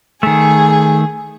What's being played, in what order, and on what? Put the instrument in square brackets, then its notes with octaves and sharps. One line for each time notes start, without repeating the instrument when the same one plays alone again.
[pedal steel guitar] D#3 A3 [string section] G#4